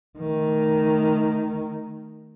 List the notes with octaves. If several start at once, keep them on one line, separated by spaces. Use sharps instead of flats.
D#3 A3